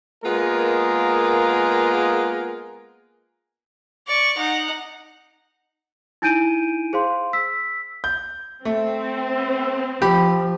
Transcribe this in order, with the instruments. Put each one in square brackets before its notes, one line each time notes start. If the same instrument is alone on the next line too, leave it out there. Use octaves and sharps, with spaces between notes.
[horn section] G#3 A#3 B3 F4 G#4 A#4
[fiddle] D5 C#6
D#4 F#5
[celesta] D#4 E4 G#5 G6 D7 D#7
G#4 C5 F5 C6
E6 B6
[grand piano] G6
[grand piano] A3 [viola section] C4
[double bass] F3 [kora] G4 [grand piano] B5